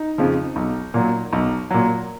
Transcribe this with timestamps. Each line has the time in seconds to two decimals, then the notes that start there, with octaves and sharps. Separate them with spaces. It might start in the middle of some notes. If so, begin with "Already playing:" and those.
Already playing: D#4
0.18 F2 C#3 F3
0.56 B1
0.94 A#2 F#3
1.33 B1
1.71 A#2 F#3